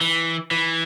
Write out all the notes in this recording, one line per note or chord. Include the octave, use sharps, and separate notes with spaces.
E3
E3